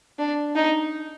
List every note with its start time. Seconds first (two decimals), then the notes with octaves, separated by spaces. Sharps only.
0.19 D4
0.55 D#4